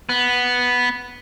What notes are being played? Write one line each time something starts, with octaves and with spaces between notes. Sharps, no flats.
B3